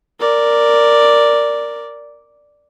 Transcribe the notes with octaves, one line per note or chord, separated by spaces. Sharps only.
A#4 D5